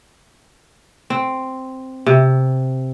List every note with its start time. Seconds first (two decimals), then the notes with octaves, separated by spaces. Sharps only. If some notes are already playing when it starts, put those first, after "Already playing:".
1.10 C4
2.06 C3